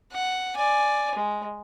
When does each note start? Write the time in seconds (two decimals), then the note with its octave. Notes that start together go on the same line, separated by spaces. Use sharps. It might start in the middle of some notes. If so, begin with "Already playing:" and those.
0.12 F#5
0.56 D5 G#5
1.15 G#3